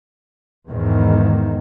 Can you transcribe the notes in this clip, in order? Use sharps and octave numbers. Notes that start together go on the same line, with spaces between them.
E2 G#2 D#3